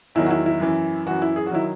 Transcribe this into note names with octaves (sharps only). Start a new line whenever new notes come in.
E2 D#3 F#3 E4
F#4
E4
E4
F#2 E3
F#2 E3 F#4
E4
G#4
F#4
D#3 F#3 E4